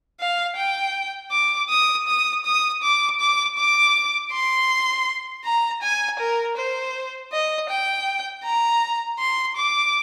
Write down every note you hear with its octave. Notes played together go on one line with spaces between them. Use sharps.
F5
G5
D6
D#6
D#6
D#6
D6
D6
D6
C6
A#5
G#5
A#4
C5
D#5
G5
A#5
C6
D6